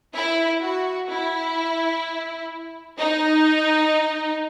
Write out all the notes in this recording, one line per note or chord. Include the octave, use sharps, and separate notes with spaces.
E4
F#4
E4
D#4